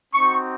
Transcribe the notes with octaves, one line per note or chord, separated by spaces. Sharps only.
C4 D#4 F#4 C#6